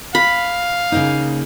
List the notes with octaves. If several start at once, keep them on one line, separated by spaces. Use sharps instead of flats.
F5 B5
C#3 A#3 D#4